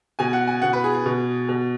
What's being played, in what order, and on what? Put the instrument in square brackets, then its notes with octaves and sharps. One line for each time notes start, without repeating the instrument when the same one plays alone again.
[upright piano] B2 G#5
F#5
G#5
B2 F#5
B4
G#4
G#4
B2
B2